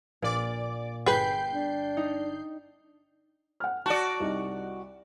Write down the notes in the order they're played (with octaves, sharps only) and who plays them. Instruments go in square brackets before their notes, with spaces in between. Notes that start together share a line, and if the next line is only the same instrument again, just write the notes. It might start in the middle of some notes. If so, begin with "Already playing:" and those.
[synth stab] A#1 D5 D6 [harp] A#2
[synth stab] G1 G6 C7 [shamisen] G#4 B4 [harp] G5 B5
[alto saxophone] D4
[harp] D#4
[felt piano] F#5 F6
[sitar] F#4 D5 [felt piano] A5
[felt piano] C2 D#4